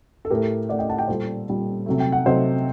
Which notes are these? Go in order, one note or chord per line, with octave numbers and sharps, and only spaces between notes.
A4
A2 A3 G4 A#4
A2 A3 D5 F#5
D#5 G5
F#5 A5
D#5 G5
A#2 G3 A4 C5
A#2 G3
C3 F#3 A3
G5
F#5
C3 F#3 A3 C5 D#5